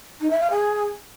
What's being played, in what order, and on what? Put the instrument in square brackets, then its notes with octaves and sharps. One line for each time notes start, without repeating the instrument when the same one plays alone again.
[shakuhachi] D#4
E5
F5
G#4